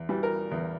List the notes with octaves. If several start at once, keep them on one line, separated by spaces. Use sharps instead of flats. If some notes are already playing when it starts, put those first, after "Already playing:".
Already playing: E2
E3 G3
A#4
E2